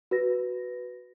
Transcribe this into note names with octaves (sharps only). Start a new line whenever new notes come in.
F#4 B4 A#6